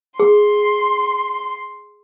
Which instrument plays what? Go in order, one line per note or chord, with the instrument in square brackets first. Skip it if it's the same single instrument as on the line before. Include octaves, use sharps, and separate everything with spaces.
[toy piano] G#4 [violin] C6